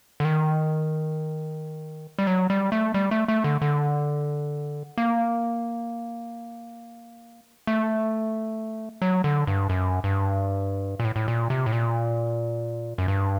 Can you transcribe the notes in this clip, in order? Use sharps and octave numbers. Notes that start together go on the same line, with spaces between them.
D3
D#3
G3
F#3
G3
A3
G3
A3
A3
D3
D3
A#3
A3
F#3
D3
G2
F#2
G2
A#2
A2
A2
A#2
C3
A2
A#2
F#2
G2